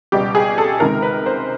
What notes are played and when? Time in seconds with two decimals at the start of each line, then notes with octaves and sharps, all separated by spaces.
0.12 C#2 B2 G3 G4
0.35 G#4
0.58 A4
0.80 C#2 C3 D#3 G#3 A#4
1.02 B4
1.26 C5